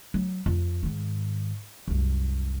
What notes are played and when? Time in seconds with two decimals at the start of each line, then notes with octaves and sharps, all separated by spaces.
0.14 F#3
0.46 F2
0.83 G#2 D#3
1.88 C2 F#2